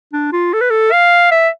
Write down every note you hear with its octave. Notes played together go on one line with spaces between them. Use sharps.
D4
F4
A4
B4
A4
F5
E5